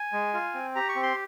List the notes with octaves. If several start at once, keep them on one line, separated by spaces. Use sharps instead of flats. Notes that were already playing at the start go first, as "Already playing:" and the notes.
Already playing: G#5
G#3
F4
C4
G4 A#5
C#6
C4
C6